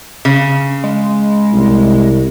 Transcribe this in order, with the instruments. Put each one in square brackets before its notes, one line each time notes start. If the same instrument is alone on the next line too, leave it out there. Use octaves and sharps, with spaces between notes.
[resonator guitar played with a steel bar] C#3
[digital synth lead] G#3
[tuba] C2